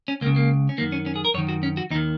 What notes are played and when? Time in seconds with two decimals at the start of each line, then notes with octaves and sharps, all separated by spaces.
0.08 C#4
0.21 C#2 A#3
0.26 C#3
0.36 A#3
0.69 C#4
0.78 F#2 D#3 A#3
0.92 C#4
1.06 C#4
1.16 G#4
1.25 A#4
1.34 F#2 C#5
1.38 D#3
1.49 F#4
1.63 C#4
1.77 F#4
1.90 D#2 D#4
1.95 D#3